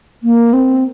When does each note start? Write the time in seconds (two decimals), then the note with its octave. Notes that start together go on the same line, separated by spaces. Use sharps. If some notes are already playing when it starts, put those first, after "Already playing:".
0.23 A#3
0.53 C4